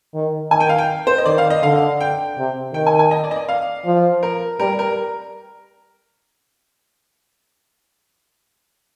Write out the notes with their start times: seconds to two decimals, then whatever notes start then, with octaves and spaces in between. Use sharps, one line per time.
0.15 D#3
0.51 D#3 G#5
0.60 G5
0.69 F5
0.78 G5
1.07 C5
1.18 D#5
1.26 D#3 D5
1.38 F5
1.50 D#5
1.63 D3 F5
2.01 G5
2.38 C3
2.74 D#3 G5
2.87 G#5
2.99 G#5
3.11 D#5
3.24 D5
3.31 D#5
3.36 D5
3.49 F5
3.85 F3
4.23 A#4
4.60 G3 A#4
4.79 A#4